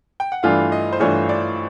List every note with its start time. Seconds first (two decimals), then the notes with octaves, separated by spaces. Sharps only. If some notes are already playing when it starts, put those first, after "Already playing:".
0.20 G5
0.32 F#5
0.43 G2 E3 A3 D4 F4 F5
0.72 D#5
0.93 C5
1.00 G2 E3 A3 D4 F4 C#5
1.29 D5